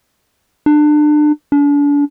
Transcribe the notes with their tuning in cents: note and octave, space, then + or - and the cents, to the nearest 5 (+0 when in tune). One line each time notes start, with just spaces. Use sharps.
D4 +30
D4 -35